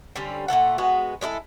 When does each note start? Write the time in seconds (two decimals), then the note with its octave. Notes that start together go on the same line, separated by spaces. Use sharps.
0.16 D3 G3 C4 C#4
0.48 A#2 A3 A4 F#5
0.78 G#3 B3 F#4
1.21 G#3 D4 E4 A4